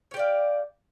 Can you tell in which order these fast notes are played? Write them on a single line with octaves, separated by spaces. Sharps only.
C#5 G4 D5 F5